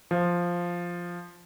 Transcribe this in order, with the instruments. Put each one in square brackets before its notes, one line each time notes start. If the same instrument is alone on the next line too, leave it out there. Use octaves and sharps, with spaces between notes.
[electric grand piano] F3